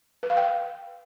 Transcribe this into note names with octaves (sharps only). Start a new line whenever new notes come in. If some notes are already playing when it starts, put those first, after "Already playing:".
B4
F5
G5